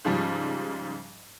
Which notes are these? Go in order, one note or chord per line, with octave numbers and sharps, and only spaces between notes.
G#2 C#3 F3 G3